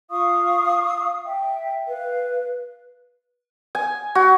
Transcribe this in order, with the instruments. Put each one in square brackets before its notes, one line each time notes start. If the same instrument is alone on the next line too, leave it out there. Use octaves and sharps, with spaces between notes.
[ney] F4 [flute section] F5 C#6 D#6
[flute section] E5 [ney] G5
[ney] B4 [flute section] F5
[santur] G#5
F#4